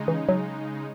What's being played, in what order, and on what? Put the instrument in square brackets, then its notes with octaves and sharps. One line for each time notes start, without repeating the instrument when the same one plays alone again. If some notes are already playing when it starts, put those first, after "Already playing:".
Already playing: [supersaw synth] C#3 G#3 D#4
[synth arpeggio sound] E3
F#3